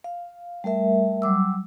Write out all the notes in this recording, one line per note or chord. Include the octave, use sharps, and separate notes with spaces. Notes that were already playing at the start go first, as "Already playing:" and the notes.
F5
G3 A3 A#4 E5
F#3 G3 D6 E6